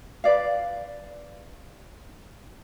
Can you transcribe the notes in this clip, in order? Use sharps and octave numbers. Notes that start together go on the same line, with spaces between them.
B4 D5 F5